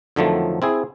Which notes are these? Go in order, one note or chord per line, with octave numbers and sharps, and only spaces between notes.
F2 D3 D#3 F3 F#3 A3
C4 E4 G#4